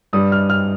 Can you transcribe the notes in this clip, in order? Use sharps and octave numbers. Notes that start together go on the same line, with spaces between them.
G2 G3 D#6
F6
F6